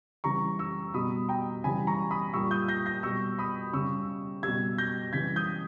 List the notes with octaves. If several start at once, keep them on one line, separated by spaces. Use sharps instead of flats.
C#3 E3 G3 A#5 C#6
C#6 E6
B2 G3 B5 D#6
G5 A#5
C#3 E3 G3 G#5 B5
A#5 C#6
B5 D#6
A#2 G3 C#6 E6
D#6 G6
G6 A#6
G6 A#6
B2 G3 C#6 E6
B5 D#6
C#3 G3 C#6 E6
B2 G3 E6 G#6
G6 A#6
C#3 E3 G3 G#6 B6
D#6 G6